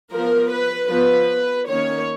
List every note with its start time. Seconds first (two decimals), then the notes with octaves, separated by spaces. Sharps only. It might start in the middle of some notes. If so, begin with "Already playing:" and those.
0.12 F3 B3 A#4
0.52 B4
0.90 F3 B3 B4
1.68 D#3 A#3 C#4 C#5